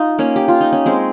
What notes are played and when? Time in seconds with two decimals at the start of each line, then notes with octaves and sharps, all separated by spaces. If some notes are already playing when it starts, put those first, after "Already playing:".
Already playing: D#4 F4
0.19 A#3 C#4
0.36 G4
0.48 F4
0.61 D#4
0.73 C#4
0.86 G#3 C4